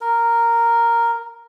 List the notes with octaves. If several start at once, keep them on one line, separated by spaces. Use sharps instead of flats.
A#4